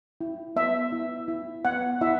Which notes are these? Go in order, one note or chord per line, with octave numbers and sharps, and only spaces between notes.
E4
B3 E5
E4
E4
B3 F#5
E4 E5